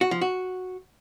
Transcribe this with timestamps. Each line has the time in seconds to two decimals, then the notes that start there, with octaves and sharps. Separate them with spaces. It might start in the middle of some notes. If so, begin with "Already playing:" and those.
0.01 F#4
0.11 F3
0.21 F#4